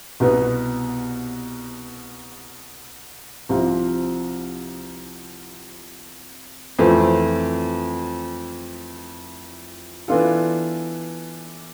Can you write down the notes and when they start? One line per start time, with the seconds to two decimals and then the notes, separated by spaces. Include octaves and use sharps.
0.20 C2 B2 B3
3.49 C2 C3 F3
6.79 F2 E3 A3 C4
10.08 E3 B3 D4 F4 A4